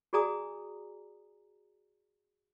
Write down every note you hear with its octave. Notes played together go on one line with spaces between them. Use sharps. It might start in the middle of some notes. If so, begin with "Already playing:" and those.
F#4 G#4 D5 G#5 A#5 D#6